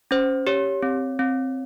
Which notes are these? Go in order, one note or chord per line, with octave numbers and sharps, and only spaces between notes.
C#4 C5
G4 C#5
C4
C4